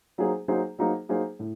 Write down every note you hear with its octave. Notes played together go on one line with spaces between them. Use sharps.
F#3 A#3 D#4 G#4 C5
F#3 A#3 D#4 G#4 C5
F#3 A#3 D#4 G#4 C5
F#3 A#3 D#4 G#4 C5
A2